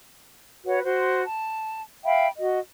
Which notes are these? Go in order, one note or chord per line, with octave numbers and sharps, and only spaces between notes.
F#4 B4 C#5 F#5
F#4 C5 C6
A5
E5 F5 G5 B5
F#4 D#5